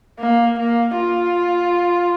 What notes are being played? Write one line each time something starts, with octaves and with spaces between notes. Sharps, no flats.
A#3
A#3
F4